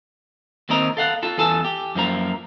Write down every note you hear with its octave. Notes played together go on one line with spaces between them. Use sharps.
D#2 D#3 C4 A#4 D#5 A#5
A4 F5 F#5
F4 A4
E2 A4 G#5 A5
G4
F#2 F3 A#3 A#5